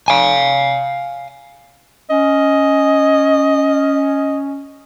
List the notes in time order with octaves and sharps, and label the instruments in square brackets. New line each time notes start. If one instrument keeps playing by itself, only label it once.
[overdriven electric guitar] F5 G#5
[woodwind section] C#4 [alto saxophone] D#5